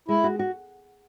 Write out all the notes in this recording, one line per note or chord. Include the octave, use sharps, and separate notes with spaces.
G#3 E4
F#4
F#4